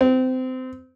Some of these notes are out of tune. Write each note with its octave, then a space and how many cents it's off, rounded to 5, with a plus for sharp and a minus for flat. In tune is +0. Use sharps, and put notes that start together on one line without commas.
C4 -25